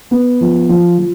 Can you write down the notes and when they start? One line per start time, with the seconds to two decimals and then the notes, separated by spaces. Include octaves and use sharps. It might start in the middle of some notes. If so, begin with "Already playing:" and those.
0.11 B3
0.41 F3
0.69 F3
0.99 F3